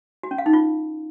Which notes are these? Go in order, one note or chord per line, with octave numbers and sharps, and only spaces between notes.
F#4
C#4
F5
D#4
F4